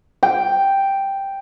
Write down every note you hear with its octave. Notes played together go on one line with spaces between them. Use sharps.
G5